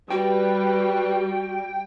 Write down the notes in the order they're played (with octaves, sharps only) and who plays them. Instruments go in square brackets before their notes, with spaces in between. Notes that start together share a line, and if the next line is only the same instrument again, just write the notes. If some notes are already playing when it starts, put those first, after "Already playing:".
[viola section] G3 [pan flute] F#4 [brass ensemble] B4 [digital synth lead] G5